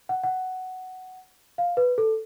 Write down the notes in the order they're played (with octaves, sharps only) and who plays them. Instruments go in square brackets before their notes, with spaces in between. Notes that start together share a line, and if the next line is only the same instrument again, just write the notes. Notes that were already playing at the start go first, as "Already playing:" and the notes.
[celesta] F#5
F#5
F5
B4
A4